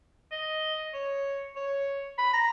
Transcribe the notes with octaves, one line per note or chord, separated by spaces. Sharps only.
D#5
C#5
C#5
B5
A#5